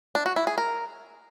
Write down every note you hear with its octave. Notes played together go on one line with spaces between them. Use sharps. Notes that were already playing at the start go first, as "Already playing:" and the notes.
D4
F#4
E4
G#4
A#4